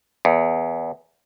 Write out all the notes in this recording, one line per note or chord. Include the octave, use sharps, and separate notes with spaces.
E2